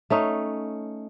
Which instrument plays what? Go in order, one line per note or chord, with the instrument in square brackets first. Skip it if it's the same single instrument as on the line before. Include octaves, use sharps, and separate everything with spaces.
[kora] A3 C#4 D#4